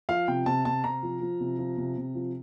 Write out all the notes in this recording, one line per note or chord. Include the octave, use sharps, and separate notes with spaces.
F3 F5
C3 G5
C3 A5
C3 A5
C3 A#5
F3
F3
C3
F3
C3
C3
F3